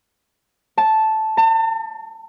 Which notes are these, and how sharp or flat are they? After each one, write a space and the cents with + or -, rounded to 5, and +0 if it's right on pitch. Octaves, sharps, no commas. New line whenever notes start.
A5 -5
A5 +40